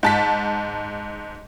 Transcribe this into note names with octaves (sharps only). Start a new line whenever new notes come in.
G#2 A5 B6